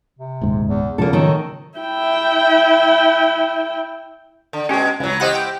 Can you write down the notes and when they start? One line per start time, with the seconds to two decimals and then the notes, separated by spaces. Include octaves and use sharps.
0.19 C3
0.41 D#1 C#2 G#2
0.68 E2
0.98 E2 A2 C#3 F3 A#3 A4
1.13 D#3 F#3 A4
1.79 E4 G5
4.53 D3
4.69 B2 G#3 C#4 G4
5.00 C#2 E3 F#3
5.20 E4 G4 C5 D#5 F#5 F#6
5.35 G5